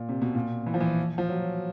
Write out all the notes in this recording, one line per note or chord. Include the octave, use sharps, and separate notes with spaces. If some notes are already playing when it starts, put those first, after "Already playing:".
Already playing: A#2
C3
B2
A#2
E3
F3
E3
F3
F#3